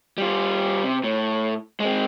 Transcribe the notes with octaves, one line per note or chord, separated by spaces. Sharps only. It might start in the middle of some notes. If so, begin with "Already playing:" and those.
G3 F4
C3
A2
G#3 C4